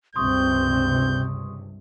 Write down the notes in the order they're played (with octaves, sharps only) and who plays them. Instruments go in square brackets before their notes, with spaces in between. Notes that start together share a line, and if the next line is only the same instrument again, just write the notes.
[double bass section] C#2 G2 C3 [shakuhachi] C4 [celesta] C6 C#6 D#6 [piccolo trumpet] G6